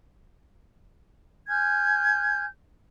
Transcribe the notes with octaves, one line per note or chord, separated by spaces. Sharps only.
G#5 F6 G6 G#6